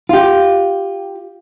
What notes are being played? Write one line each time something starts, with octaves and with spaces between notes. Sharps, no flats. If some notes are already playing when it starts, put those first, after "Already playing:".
F4 G4